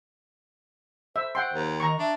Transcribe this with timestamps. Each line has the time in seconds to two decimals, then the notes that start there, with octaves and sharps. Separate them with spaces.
1.16 C5 E5
1.35 F#5 G5 C6
1.53 D#2
1.80 D#3 A#5 C#6
1.99 D4 E5